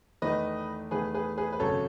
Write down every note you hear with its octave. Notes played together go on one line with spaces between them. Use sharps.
E2 D#3 A3 B4 D#5
E2 D#3 A3 G#4 B4
G#4 B4
G#4 B4
B4
G#1 F#2 C#3 F#3 A4 C#5